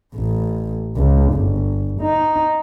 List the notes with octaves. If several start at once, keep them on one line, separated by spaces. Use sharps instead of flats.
A1
C#2
G1
D#4